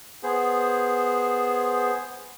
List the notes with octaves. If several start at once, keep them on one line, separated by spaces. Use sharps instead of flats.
B3 G#4 C5